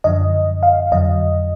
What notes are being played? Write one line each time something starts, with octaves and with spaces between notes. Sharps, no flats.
F#2 D3 F3 D#5
F5
F2 D3 F#3 D#5